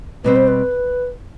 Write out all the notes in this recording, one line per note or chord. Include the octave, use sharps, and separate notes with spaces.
B2 G3 C4 B4
C5
B4